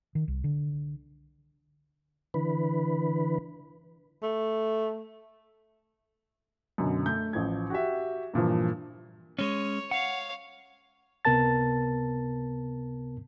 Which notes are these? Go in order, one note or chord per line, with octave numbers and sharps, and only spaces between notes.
D#3
C2
D3
D3 E3 B4
A3
F#2 B2 D3
A3 G6
A1 F3 G#6
F#4 G4 E5
G2 A#2 E3 F3
G#3 C#4 C#5
C#5 F5 F#5
C#2 C3 B3 A#4 A5 A6